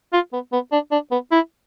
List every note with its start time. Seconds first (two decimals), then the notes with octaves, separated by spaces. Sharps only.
0.13 F4
0.33 B3
0.52 B3
0.72 D4
0.91 D4
1.11 B3
1.31 E4